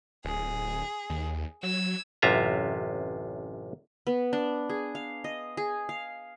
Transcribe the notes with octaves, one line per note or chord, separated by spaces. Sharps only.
D1 G#4
D#2
F#3 E6 G#6
A1 F#2 C3 F4 E5 A#5
B3
D4
G#4
F5
D#5
G#4
F5